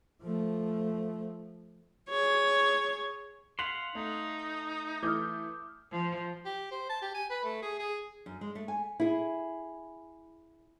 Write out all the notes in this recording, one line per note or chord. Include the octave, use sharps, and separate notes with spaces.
F3 A3
G#4 C#5
F5 F#5 C6 B6
A3 D#4
E3 A3 D6 D#6 F6 G6
F3
G4
C5
A5
G4
G#5
B4
A3
G#4
G#4
F#2
G#3
A3
G#5
E4 G#4